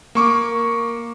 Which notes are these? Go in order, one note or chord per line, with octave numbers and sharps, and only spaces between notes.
A#3 C#6 D6